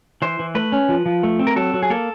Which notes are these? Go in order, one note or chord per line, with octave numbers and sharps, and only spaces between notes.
E3 C5
E3
A3 B4
C#4
F3
F3
A3
C4
A#4
F#3 A4
F#3
G#4
A#3 A4